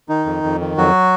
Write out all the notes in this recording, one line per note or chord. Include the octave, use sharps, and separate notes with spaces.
D#3 D#4
F2
F2
D#3
F2 F#3 F#4